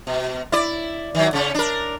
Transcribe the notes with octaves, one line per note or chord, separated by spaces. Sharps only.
B2
E4 D5
D#3 F#3
C#3 C#4
D4 A#4